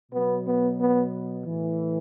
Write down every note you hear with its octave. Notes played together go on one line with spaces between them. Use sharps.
B2 F#3 B3
B3
B3
A2 E3